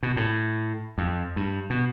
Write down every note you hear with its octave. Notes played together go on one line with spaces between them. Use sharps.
B2
A2
F2
G2
B2